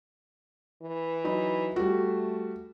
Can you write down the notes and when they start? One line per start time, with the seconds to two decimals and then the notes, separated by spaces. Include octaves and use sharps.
0.82 E3
1.24 F#3 D#4 B5
1.76 G3 A3 F#4